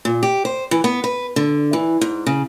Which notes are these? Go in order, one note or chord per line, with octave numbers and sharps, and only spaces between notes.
A#2
G4
C5
E3
B3
B4
D3
E3
G#2
C#3